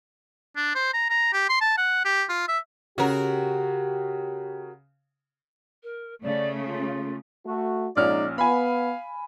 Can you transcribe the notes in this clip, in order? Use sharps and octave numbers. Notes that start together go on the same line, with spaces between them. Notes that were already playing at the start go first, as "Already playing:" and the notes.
D4
C5
A#5
A#5
G4
C6
A5
F#5
G4
F4
E5
C#3 F#4 G4 A#4
A#4
C#3 A3 D5
F4
A3 F#4
A#1 G#3 C#4 D#4 D5 F6
B3 F5 G#5 B5